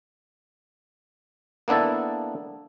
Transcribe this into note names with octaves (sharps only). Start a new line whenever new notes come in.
A#3 B3 D4 E4 A4